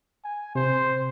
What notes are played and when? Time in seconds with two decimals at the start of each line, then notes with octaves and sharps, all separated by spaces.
0.24 G#5
0.55 C3 C5